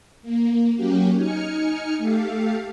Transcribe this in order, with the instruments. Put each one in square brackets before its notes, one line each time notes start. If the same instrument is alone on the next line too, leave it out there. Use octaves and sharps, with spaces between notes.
[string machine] A#3
F#3 A#3 C#4 F#4 G4
D#4 G#5 F6 C#7
A3 G4 A4 F5